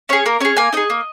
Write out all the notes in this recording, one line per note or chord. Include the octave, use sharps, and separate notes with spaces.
C#4 G#4 C#5
A#3 A#4
C#4 G#4 C#5
A#3 G#5
D#4 G#4 D#5
A#3